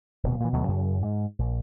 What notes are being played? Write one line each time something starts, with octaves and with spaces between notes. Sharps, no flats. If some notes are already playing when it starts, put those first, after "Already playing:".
D1 B2
A#2 E3
D2 B2 F#3 A3
F#2 C#3
G#2
A#1